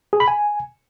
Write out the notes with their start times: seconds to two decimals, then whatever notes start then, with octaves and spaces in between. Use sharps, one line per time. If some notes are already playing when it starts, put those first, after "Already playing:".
0.13 G#4
0.20 B5
0.28 G#5